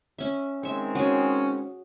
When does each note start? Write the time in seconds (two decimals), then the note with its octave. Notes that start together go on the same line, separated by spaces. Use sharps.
0.19 C#4 E5
0.63 D#3 G#3 C4 C#5 E5
0.95 F#3 C#4 G#4